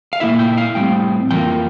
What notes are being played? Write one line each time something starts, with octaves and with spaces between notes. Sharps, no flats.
F5
A#2 G3 A#3 E4 E5
G5
E5
F5
A2 G3 C4 G5
F2 E3 A#3 F4 G5